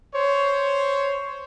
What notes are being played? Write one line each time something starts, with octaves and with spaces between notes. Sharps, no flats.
C5 C#5